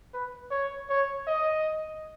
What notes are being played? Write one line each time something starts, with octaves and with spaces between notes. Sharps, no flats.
B4
C#5
C#5
D#5